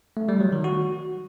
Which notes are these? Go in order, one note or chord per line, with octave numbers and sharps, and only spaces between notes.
A3
G3
F#3
D#3
F#4